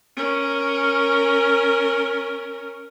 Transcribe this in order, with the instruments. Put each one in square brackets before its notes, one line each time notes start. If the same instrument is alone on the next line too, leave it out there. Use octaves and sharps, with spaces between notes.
[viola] C#4 A#4